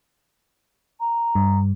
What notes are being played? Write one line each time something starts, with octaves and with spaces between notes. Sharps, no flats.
A#5
G2